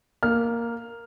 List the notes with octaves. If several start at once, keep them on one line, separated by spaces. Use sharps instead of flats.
A#3 F6